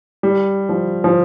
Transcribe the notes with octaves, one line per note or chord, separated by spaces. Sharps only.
G3
F3
F3